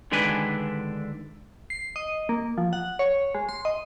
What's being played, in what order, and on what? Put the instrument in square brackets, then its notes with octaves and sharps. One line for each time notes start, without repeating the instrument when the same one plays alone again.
[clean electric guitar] D3 D#3 G#3 D4 B4 G#5
[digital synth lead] C7
D#5
A#3
F3
F#5
C#5
G#3
C6
D#5